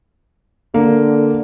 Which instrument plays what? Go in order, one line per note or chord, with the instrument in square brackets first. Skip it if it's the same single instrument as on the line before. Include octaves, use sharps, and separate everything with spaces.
[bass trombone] D3 [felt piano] A#3